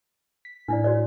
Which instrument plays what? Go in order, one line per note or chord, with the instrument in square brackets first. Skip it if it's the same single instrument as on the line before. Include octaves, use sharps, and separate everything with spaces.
[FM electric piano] B6
[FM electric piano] A2 [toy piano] D4 E4 D5
[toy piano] F#4 C#5 D5